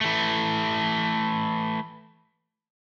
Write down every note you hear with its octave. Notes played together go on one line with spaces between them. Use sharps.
E3 A3